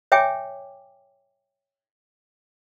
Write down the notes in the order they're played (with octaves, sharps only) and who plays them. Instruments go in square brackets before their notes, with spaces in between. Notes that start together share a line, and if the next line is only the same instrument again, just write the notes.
[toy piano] C#5 E5 G5 G#5 D6